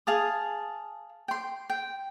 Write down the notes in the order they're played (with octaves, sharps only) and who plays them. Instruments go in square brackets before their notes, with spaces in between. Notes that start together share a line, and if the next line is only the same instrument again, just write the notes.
[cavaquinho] G#4 F5 A5 D#6
G5 C6
G5